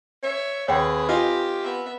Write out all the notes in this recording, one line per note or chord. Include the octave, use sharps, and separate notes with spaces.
C#5 E5
D#2 C4 G#4 B4 C#5 F#5 G5
F4 G4 D#5 G#5
B3 E5